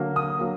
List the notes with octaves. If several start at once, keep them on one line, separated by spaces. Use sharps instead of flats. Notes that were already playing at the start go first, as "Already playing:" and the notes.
Already playing: D3 F#3 A#3
D#6
F#3 A#3